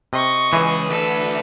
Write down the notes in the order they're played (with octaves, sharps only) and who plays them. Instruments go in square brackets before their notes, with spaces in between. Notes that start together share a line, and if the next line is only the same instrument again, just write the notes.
[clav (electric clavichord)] C3 [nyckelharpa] D#5 C#6
[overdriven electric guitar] C#2 G#4 [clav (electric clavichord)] E3
[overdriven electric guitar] D2 A4 [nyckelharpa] B4